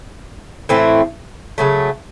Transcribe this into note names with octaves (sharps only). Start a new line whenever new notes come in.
A2 E3 A3 C4
C#3 F#3 A3